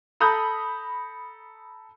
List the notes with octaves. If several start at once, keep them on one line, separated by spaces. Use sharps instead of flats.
A4 A#5 B5 D#6 G6